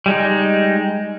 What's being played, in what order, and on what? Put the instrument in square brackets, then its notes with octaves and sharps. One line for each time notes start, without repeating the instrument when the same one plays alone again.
[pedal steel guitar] G3 G#3 D#4